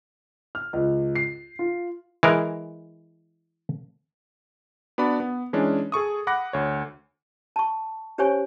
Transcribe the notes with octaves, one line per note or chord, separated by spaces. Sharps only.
F6
C#2
C7
F4
E3 G#3 A#4
B3 D4 F#4 D5 B5
B3
E3 G#3 C#4 D4
G#4 A4 C#6 D#6
F#5 B5 D6 F#6 A#6
D2 C#5
A5 C#6
C#4 G4 C5 C#5 G#5 C#6